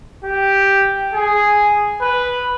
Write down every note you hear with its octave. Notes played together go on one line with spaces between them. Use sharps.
G4
G#4
B4